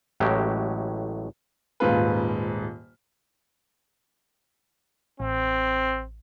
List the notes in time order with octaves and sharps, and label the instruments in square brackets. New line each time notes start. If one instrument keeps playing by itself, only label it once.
[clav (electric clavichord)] A1 A2 F#3 G#3 G4
[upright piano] D#1 G#2 F4 B4
[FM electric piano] A1 [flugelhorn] C4